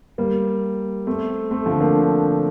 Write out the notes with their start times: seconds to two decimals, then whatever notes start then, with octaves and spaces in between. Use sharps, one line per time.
0.18 G3 A#3
1.07 A3 C4
1.51 A3 C4
1.66 D3 F3
1.80 A#3 D4